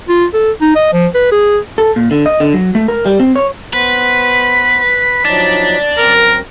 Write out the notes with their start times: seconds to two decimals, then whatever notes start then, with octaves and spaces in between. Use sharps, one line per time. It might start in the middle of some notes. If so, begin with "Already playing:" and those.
0.09 F4
0.34 A4
0.61 D#4
0.75 D#5
0.93 F3
1.15 B4
1.32 G#4
1.78 A4
1.96 A#2
2.11 D3
2.26 D#5
2.40 D3
2.54 F#3
2.75 A3
2.88 A#4
3.06 G3
3.20 C4
3.36 C#5
3.73 B3 B4 C5 B6
5.25 F3 F#3 D#4 D5 A5
5.98 F#2 C4 A#4